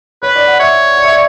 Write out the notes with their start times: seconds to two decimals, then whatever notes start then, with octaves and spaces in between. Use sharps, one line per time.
0.22 B4 C#5
0.36 D5
0.47 F#5
0.60 C#5 E5
0.97 D5
1.05 E5
1.13 D5